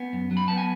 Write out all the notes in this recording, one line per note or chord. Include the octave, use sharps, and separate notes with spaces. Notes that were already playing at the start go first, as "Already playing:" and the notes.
Already playing: B3 G#5
F#2
F#3
B5
B3 A5
G#5